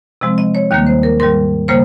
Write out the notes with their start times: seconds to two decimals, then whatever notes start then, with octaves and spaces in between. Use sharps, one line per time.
0.21 C3 F3 G#3 C4 D#5
0.38 D#5
0.55 C#5
0.71 D#2 D#3 G3 A#3 D#5
0.87 C5
1.03 A#4
1.20 G#2 D#3 G3 A#4
1.68 C#3 G3 A#3 C5